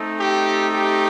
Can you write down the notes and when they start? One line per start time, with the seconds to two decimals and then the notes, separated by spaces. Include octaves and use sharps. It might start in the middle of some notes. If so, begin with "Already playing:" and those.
Already playing: A3 C4 D#4
0.20 G4
0.74 G4